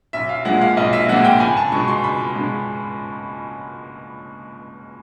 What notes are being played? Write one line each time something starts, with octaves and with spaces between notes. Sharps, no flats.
B1 E5
F5
A#2 F3 G#3 F#5
F5
B1 D#5
E5
A#2 F3 G#3 F#5
G5
C#2 G#5
A5
B2 G#3 C#6
C6
C#2 B5
B2 G#3